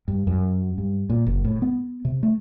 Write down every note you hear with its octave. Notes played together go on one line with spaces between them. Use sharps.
G2
F#2
G2
A#2
F#1
A2
B3
C3
A3